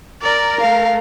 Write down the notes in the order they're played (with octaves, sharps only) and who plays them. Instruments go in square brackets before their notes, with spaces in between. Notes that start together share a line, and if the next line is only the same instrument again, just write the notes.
[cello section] A#4 [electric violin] D5
[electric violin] A3 [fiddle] F5